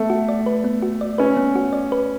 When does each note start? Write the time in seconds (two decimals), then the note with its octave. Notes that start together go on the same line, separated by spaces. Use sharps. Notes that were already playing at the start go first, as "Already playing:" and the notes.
Already playing: A3 B3
0.10 F#4
0.29 D5
0.46 B4
0.64 B3
0.82 F#4
1.01 D5
1.18 C#4 B4
1.37 B3
1.55 F#4
1.73 D5
1.92 B4